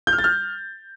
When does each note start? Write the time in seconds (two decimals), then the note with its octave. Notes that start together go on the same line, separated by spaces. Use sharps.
0.07 G6
0.13 F6
0.18 A6
0.24 F6